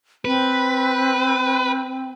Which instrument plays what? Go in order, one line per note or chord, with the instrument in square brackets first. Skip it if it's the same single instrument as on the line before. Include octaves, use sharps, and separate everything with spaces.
[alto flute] C4 [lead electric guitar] B4